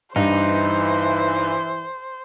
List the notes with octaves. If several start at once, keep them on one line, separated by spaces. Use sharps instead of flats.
G2 E3 D#4 C5